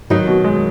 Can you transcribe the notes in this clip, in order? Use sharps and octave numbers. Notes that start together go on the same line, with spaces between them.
D#3 F#3 D#4
B2
G#3